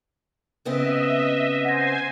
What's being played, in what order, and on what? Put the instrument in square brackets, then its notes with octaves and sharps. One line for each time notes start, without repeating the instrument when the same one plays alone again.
[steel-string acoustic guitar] C#3 B3 C4 [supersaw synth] D#5 E5
[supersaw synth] C5 G#5 [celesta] F#5 A#6